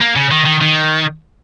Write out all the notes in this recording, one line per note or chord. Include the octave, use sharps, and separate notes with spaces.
A#3
C#3
D#3
D#3
D#3